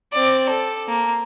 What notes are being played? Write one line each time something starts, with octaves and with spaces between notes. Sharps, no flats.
C4 D5
A4
A#3